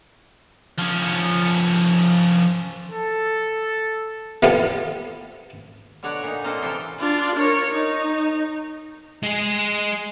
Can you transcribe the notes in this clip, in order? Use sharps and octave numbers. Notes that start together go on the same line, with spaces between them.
F3 C#4
A4
C3 G3 B3 F4 A4
B2 D3 C#5 D5 F#5 A#5
A#2 D#4
A#3 C4 F4 A4 D#5 A#5
A2 C3 E3 A4 G5
D4 F4
A#4 C#5
D#4
G#3 G#4